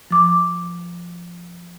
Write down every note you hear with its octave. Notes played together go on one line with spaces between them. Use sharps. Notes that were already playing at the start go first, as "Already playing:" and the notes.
F3 D6